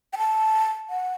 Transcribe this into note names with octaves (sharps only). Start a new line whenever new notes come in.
G5
A5
F#5